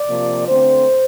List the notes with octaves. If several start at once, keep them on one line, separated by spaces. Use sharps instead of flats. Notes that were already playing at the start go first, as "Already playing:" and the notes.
Already playing: D5
C3 F3 A#3
D3 A3 C4 C5